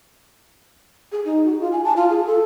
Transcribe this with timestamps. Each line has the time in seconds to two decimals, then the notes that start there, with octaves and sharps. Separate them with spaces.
1.12 G#4
1.25 D#4
1.45 F#4
1.60 F4
1.72 G#5
1.84 A5
1.96 F4
2.10 G#4
2.26 A4